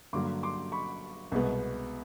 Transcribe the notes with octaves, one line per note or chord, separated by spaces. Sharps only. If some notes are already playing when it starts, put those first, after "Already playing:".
G2 D3 F#3 A#3 C6 D6
C6 D6
B5 C#6
C2 B2 G#3 B3